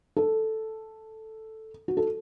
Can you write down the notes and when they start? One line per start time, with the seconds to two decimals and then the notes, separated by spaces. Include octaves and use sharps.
0.16 A4
1.88 F#4
1.97 A4